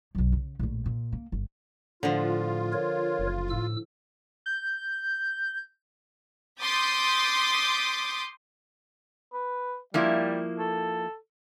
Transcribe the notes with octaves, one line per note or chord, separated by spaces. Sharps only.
B1 F#2
C#3
A#1 A2
A#2
A#3
G1
A2 D3 F3 F4
A#4 C#5
F#1
A2 E6
G6
C6 D6 D#6 G6 A6 B6
B4
F3 G3 A#3 E4
A4